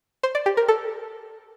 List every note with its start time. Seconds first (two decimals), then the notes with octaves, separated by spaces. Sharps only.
0.23 C5
0.35 D5
0.46 G4
0.57 A#4
0.68 A4